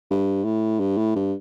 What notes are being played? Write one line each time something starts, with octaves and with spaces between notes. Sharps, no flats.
G2
A2
G2
A2
G2